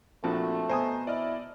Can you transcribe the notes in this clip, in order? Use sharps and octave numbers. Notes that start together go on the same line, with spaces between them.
A#1 F3 A3 C4 F#4 A5
B2 C5 G#5 A#5 D#6
E4 D5 D#5 F6